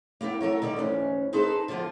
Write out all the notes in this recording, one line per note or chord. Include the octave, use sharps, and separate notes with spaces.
A#3 B3 E4 G4
F#3 A4 A#4 C#5
D3 D#3 G3 D5
D2 G#2 E3 C#4
D#4 G#4 A4 B4 C5
D3 F3 B3 F4